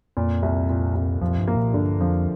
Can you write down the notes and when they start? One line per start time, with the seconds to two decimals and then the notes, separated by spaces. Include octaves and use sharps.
0.17 F2 A#2
0.42 C2
0.69 A#2
0.95 C2
1.21 F2 F3
1.39 G2
1.48 A#3
1.56 A#2
1.74 G2 D3
2.00 F2 F3